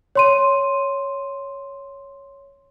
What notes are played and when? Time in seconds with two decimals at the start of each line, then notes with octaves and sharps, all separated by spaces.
0.16 C#5 C6 D#7